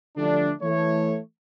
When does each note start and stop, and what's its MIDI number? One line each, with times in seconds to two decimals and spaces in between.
0.17 0.51 50
0.17 0.51 53
0.17 0.51 55
0.17 0.51 57
0.17 0.51 62
0.62 1.18 52
0.62 1.18 57
0.62 1.18 73